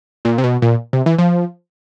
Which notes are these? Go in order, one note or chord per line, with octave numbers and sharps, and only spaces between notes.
A#2
C3
B2
A#2
C3
E3
F3